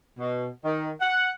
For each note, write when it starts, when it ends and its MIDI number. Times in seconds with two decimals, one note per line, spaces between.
0.18 0.47 47
0.65 0.90 51
1.01 1.29 78